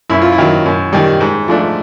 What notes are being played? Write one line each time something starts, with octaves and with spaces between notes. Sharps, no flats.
F#2 E4
F4
E4
D#3 F#3
F#2
D#3 G3
G#2
F3 A3 D4